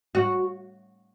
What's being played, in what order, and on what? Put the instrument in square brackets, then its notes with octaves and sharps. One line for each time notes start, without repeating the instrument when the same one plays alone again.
[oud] F#4